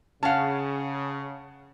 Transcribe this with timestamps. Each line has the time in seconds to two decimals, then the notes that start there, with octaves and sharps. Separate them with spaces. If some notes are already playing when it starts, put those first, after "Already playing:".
0.23 C#3 C#4 F5 F#5 A5